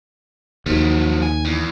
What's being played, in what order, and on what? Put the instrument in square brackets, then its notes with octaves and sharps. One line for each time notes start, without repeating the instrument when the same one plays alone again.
[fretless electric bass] D#2 [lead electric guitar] F3 F#3
[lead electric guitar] G#5
E2